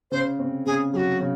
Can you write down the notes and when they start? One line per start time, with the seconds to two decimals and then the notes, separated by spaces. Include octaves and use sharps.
0.11 C#3 C5
0.39 C4
0.66 C#3 G#4
0.93 F#3 F#4 G#4
1.20 C#3